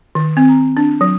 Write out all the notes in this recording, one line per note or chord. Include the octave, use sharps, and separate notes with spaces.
D#3
C4
A#5
D4
F#3